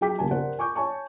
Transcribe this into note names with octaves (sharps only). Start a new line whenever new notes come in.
F#3 G#4 G5 D6 B6
B1 C#3 A#3 G4 G#5 A5
G4 A#4 C5 D5 F#5
G#5 C#6 D6 G6
C#5 G#5 A5 C#6